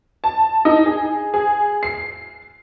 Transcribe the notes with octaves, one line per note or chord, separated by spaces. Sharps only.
A5
D#4
G#4
G#4
C7